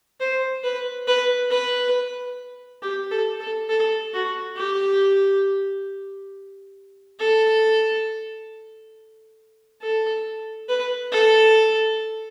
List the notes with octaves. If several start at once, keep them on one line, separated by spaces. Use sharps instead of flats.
C5
B4
B4
B4
G4
A4
A4
A4
F#4
G4
A4
A4
B4
A4